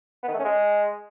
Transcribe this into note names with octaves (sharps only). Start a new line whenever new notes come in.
B3
D#3
A3
C#4
G#3